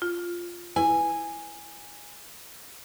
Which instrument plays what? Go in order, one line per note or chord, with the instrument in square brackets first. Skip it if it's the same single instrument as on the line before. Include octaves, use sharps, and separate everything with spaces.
[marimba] F4
[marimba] E4 B4 [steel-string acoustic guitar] G#5